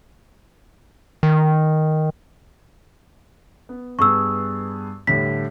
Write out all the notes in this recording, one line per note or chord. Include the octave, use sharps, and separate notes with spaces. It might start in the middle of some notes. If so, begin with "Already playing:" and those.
D#3
B3
G2 B3 G#4 C#6 E6
A2 D3 G3 B6